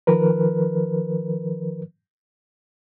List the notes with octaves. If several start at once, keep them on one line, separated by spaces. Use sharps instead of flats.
D#3 F3 A#4 B4